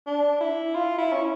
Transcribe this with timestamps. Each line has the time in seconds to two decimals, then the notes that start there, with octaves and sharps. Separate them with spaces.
0.07 D4
0.41 E4
0.75 F4
0.98 E4
1.13 C#4